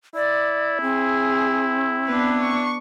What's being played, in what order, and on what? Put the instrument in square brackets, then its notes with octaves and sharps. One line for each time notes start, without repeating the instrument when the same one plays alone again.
[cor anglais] E4 [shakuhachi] D5
[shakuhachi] C4 [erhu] G#4
[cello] B3 D4 [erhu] B4
[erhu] C#6